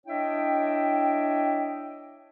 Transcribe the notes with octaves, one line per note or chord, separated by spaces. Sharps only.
D4 E4 C#5 D#5 E5 G5